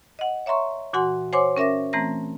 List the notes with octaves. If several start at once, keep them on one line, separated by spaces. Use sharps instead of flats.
D#5 F#5
C#5 E5 A#5 C6 C#6
A#2 E3 F#4 F#5 G#5 C6
C5 C#5 F#5 G#5 C6 D6
C#4 A#4 E5 D6 A#6
E3 A3 C4 A#5 A#6